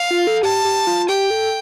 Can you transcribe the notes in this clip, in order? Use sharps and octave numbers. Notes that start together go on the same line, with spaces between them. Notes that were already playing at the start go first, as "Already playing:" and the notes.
Already playing: F5
F4
A4
G4 A5
G4
F4
G4 G5
A4